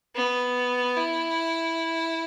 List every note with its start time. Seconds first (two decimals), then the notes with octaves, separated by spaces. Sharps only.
0.15 B3
0.97 E4